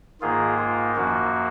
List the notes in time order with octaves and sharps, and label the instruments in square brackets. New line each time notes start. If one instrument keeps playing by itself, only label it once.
[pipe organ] G#2 D#3 A#3 F4 G#4
F4
F#2 F3 A#3 F#4